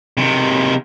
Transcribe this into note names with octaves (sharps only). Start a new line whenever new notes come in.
C3 D#3